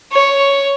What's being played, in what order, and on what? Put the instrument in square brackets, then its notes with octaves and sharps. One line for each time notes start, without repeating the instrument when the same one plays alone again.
[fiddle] C#5